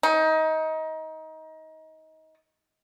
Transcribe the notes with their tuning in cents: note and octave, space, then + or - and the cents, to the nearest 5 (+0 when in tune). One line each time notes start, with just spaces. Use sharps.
D#4 +25